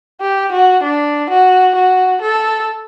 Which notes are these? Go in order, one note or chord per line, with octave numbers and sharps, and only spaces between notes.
G4
F#4
D4
F#4
F#4
A4